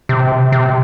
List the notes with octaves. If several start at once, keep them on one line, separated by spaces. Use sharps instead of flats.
C3
C3